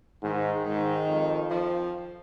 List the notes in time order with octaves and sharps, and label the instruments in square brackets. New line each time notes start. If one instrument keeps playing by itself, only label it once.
[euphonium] G#2 [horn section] D#3
[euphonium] G#2 [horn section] D#3
[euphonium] F2
[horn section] F3